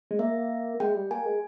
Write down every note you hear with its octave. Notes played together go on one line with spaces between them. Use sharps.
G#3
A#3 E5
G#3 G5
G3
A#3 G#5
G#3